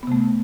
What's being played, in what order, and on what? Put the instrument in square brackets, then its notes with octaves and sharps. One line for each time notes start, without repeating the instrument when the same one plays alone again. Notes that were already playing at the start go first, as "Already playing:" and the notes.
[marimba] B3
C3
A3